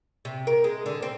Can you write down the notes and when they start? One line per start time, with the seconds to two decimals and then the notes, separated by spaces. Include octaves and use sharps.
0.25 C3
0.47 A#4
0.64 G#3
0.86 D3
1.03 C4